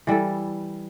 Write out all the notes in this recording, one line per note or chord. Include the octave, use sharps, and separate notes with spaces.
E3 G3 E4 A4